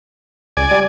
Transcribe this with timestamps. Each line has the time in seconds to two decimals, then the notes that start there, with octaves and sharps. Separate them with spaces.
0.57 C#2 D5 G#5
0.71 G3